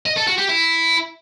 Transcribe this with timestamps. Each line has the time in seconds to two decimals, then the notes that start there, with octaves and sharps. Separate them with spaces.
0.06 D#5
0.17 A4
0.27 F#4
0.38 G4
0.49 E4